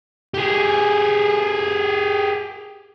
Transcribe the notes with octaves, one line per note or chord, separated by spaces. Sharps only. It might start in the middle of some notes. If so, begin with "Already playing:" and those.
G4 G#4